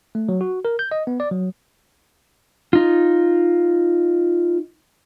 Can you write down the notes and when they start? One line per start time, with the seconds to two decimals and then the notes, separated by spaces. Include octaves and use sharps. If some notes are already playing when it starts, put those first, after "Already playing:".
0.15 A3
0.29 F#3
0.41 F#4
0.65 A#4
0.79 G6
0.91 D#5
1.07 B3
1.20 D5
1.31 F#3
2.73 D#4 F4